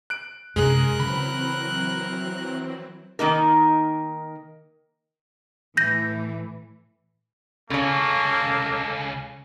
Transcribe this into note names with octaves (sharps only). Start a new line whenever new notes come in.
F#6 D7
F#2 C3 G#3 C#4 G#4 A#4 F#6
C#3 E3 F#3 C4 B5
D#3 A#3 D#4 A#4
A2 E3 G6 A#6
C#2 C#3 A#3 C#4 A4 C#5